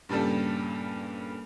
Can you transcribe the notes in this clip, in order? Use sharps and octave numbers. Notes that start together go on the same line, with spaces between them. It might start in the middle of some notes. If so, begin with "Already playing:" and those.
G2 A#2 C#3 G3 A4